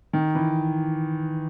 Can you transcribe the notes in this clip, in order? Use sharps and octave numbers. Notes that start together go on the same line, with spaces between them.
D#3
E3